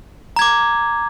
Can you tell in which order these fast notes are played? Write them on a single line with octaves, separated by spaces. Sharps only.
A#5 G#6 D6